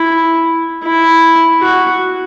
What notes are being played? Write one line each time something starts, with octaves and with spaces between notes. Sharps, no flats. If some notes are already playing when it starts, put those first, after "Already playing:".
Already playing: E4
E4
F#4